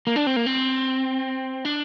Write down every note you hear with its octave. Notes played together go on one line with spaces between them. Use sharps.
A#3
D4
C4
A#3
C4
D4